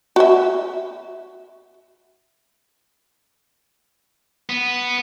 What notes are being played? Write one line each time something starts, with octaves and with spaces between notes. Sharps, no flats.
F#4 E5
B3